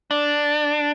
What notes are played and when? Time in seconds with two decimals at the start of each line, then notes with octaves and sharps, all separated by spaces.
0.11 D4